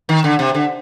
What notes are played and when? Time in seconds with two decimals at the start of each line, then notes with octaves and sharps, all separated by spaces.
0.09 D#3
0.24 D3
0.39 C3
0.55 D3